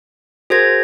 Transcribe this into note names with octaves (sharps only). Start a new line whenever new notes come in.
F#4 G#4 A#4 C5 G#6 A#6